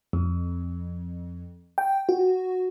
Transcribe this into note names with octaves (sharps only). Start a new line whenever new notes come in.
F2
G5
F#4